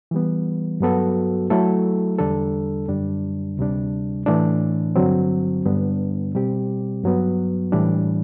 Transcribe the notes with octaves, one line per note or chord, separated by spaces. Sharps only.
E3 G3 B3
G2 F#3 B3 F#4 A4
F#3 A3 E4 A4
E2 D3 G3 D4 A4
F#2 D3 G3 D4
D2 C3 G3 D4
A2 E3 A3 D4
G2 D3 F#3 C4
G2 D3 G3 B3 D4
B2 G3 C4 G4
G2 F#3 B3
A2 E3 G3 D4